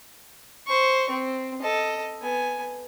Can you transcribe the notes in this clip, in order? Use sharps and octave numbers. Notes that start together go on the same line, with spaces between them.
C5 C#6
C4
A4 D#5
B3 G#5